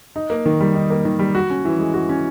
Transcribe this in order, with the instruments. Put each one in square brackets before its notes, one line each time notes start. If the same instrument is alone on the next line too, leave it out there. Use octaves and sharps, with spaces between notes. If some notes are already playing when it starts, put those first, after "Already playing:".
[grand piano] D#4
A#3
D#3
G3
D#4
A#3
D#3
G3
F#4
C#4
E3
G#3
F#4
C#4